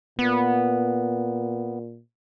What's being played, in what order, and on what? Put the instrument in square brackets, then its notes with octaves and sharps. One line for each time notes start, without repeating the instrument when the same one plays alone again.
[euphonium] A#2 [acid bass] B3